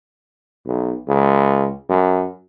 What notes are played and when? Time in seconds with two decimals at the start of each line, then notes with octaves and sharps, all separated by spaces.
0.67 B1
1.08 C#2
1.90 F#2